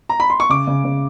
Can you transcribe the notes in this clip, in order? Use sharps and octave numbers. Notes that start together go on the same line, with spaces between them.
A#5
B5
C6
C#6
C#3 D6
C#3
C#3